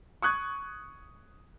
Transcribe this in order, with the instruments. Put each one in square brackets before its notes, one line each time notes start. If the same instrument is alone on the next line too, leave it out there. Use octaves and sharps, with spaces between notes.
[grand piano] C#6 D#6 F#6 G#6